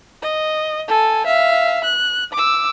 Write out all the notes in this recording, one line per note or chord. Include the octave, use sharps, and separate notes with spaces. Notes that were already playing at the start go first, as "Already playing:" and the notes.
D#5
A4 G#5
E5 F5
F#6
D6 E6